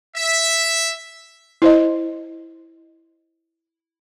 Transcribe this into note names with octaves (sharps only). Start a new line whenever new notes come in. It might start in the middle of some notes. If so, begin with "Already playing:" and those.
E5
E4 C5 D#5